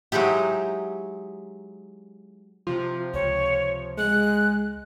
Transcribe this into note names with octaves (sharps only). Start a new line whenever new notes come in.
F#3 G#3 D#4 E4 G4
C3 F3 F4
C#2 C#5
G#3 F#6